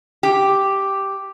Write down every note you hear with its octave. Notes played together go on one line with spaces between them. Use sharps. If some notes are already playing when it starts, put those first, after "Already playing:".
G4